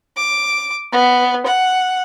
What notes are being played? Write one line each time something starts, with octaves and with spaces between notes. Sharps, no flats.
D6
B3
F#5